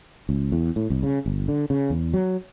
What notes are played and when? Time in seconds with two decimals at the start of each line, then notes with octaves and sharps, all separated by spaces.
0.29 C#2
0.52 E2
0.76 A2
0.90 C2
1.03 C#3
1.26 G1
1.48 D3
1.70 C#3
1.90 E2
2.14 F#3